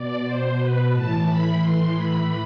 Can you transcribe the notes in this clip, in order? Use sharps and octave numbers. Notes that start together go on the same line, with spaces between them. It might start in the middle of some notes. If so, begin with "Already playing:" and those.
Already playing: B2 D5
B2 C5
B2 B4
A2 E3 A5
A2 E3 B5
A2 E3 C6
A2 E3 B5